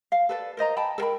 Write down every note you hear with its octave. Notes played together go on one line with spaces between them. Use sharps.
F5
A4 B4 D5
A#4 C5 D#5 A#5
G5 A5 B5
A4 A#4 G5 B5